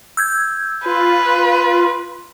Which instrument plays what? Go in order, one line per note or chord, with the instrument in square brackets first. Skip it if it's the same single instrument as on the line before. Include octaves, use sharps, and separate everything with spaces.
[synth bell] E6 G6 G#6
[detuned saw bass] F4 [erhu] B4 [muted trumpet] C6